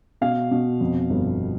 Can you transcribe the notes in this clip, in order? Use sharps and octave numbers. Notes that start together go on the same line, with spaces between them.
B2 F5
B2
F2
G1